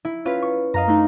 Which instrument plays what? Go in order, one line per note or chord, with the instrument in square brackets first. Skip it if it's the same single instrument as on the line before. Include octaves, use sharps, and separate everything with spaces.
[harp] E4
C#4 F4 B4
C#6
[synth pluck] F#2 [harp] D#5 F5 A#5
[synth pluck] A3 D4 D#4